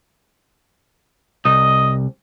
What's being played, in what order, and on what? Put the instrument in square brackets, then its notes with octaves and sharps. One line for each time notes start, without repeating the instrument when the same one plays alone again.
[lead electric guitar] C2 [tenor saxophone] D#5